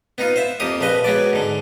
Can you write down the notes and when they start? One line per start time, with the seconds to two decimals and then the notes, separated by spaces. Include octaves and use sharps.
0.18 B3 D#4 F4
0.36 C5 E5
0.60 F2 A#3 G4 D#6
0.81 A#1 F3 B4 D#5
1.04 F#3 G#3 B3 D5
1.33 G#2 D3